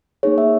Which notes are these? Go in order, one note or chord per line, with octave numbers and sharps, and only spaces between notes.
A#3 D#4 G#4 C#5
E5